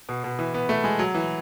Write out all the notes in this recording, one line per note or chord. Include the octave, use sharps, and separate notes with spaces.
B2
B2
E3
B3
A3
G#3
F#3
E3